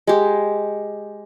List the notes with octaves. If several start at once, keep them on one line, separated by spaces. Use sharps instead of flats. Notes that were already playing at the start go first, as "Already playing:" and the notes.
G#3 G4